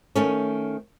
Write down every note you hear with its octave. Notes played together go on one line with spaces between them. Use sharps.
D#3 A3 C#4